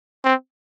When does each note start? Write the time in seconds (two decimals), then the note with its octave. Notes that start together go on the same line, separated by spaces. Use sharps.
0.25 C4